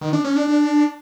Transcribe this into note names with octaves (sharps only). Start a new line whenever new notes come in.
D#3
D4
C#4
D4
D4